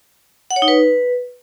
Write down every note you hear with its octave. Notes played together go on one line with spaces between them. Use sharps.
F#5
C#5
D#4
B4